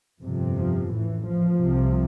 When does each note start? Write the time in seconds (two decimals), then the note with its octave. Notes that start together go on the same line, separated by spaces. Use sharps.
0.21 G1 F2 C3
0.56 F3
0.92 A1 A2 E3
1.27 F3
1.62 C2 C3